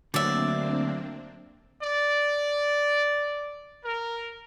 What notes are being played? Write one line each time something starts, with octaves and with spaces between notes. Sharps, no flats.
D2 D3 F#3 A#3 C4 D4 D5 E5
D5
A#4